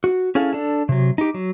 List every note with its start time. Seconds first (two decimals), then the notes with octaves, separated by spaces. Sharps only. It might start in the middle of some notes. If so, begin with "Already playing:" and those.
0.04 F#4
0.35 C#4 E4 G#4 A4 F5
0.53 D4 A4
0.89 C3 F#3
1.18 D#4 G4
1.34 F#3